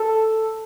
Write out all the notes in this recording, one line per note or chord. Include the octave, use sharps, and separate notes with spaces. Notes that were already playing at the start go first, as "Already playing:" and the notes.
Already playing: A4